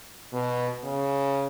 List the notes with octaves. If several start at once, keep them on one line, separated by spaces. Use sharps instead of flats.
B2
C#3